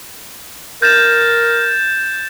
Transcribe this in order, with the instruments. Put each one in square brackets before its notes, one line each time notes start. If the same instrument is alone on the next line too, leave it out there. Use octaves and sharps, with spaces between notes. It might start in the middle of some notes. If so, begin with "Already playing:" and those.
[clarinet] A#4 [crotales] G6 A6 E7